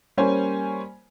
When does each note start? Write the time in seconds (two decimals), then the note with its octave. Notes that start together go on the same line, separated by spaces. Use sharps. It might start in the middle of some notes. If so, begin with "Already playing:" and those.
0.17 G3 A#3 C#4 C5 G#5